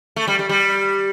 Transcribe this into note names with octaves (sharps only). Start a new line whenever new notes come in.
A3
G3
G3
G3